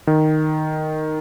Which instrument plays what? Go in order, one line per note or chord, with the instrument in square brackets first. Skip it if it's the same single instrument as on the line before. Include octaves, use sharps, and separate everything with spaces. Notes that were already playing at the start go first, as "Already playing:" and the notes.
[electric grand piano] D#3